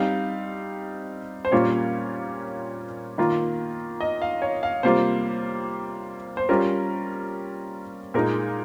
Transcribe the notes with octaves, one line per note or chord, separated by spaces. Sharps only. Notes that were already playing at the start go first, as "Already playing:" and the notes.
Already playing: G3 C4 D#4 F5
C5
A#2 G3 A#3 C#4 F4 C#5
D#3 A#3 F4
D#5
F5
C#5
F5
C3 G3 A#3 F4 C5
C5
G3 C#4 F4 A#4
A#2 G#3 D#4 A#4